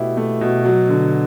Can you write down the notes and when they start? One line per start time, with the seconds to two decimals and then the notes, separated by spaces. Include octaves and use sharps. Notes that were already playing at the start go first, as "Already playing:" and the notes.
Already playing: B2 A3 E4 G4
0.17 A3
0.41 B2
0.65 F#3
0.89 D3